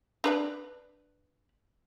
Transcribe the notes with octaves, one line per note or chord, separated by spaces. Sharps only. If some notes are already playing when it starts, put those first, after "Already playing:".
D4 B4 D5